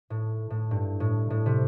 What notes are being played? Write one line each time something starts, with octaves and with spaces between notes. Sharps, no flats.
A2
A2
G2
A2
A2
C3